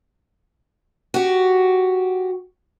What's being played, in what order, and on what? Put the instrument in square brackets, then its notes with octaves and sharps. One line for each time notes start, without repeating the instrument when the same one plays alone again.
[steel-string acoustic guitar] F#4 G4